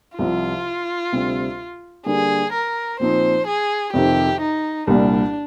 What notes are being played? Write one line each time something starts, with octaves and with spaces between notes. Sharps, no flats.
C2 C3 F3 F4
D2 C3 G3 C4 G4
D3 G3 A#3 G#4
A#4
A#2 F3 C4 D#4 C5
G#4
F2 C3 D#3 G4
D#4
C2 A#2 G3 D4